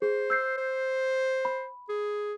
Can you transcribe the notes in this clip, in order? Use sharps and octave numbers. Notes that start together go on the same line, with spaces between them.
G#4 C5
E6 G6 C7
C5
B5
G#4